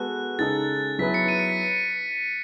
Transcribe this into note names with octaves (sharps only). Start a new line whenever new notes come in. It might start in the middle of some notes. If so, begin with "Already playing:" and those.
Already playing: G#3 B3 F#4 A4 F#6
C#3 G#3 D#4 A4 A6
F#3 B3 E4 G#4 B4 B6
C#7
D#7
C#7
B6